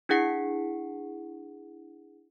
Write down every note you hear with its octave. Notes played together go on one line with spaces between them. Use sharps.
D4 E4 G#4 F#5 C7 C#7